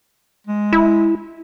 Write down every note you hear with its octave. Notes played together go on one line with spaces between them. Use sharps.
G#3
E4